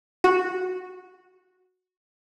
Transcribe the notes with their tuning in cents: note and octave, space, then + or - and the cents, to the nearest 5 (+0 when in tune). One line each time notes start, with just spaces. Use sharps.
F#4 -10